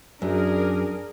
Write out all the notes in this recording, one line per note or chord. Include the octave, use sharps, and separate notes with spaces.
F#2 D4 G#4 A#4